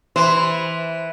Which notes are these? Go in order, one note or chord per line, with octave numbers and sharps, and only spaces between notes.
E3 C5